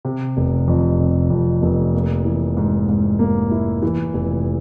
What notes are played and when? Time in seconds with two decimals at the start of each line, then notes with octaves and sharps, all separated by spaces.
0.05 C3
0.37 F1
0.68 F2
1.00 C3
1.30 F2
1.62 F1
1.93 A#3
2.25 E3
2.57 G#2
2.89 G#2
3.19 A#3
3.51 E4
3.82 E3
4.14 F1